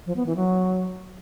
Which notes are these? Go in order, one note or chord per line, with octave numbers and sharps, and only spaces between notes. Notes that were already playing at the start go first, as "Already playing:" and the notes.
F3
B3
E3
F#3